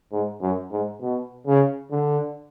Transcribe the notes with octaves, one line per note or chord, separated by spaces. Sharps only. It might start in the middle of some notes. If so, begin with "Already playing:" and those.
G#2
F#2
G#2
B2
C#3
D3